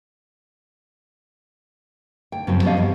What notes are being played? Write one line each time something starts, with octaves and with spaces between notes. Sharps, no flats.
D2 G5
F#2 C#3 F3 F#3 C4
F3 B3 C#4 G4 D#5 F5
E2 G2 C4